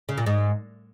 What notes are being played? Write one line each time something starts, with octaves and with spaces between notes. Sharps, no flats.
C#3
A#2
G#2